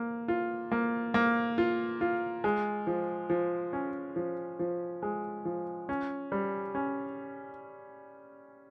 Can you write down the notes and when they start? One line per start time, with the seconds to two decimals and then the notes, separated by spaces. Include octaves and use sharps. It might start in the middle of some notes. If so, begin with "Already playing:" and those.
Already playing: A#3
0.28 F4
0.72 A#3
1.14 A#3
1.58 F4
2.01 F4
2.44 G#3
2.87 F3
3.30 F3
3.73 C#4
4.16 F3
4.59 F3
5.03 G#3
5.45 F3
5.89 C#4
6.32 G3
6.75 C#4